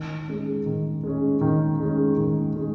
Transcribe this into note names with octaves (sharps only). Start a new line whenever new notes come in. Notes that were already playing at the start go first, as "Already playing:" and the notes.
Already playing: D#3
G#3 C#4
D#3
G#3 C#4
D#3
G#3 C#4
D#3
G#3